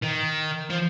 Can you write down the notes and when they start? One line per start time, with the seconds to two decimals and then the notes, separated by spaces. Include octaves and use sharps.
0.02 D#3
0.70 F3